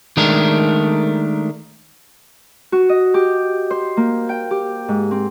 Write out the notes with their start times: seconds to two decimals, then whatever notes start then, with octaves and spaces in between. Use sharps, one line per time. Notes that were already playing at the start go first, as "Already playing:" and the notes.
0.17 D#3 G#3 A3 D4 A#4
2.72 F#4
2.89 D#5
3.14 G4
3.70 C5
3.97 A#3
4.29 G5
4.51 G4
4.88 G#2
5.11 C4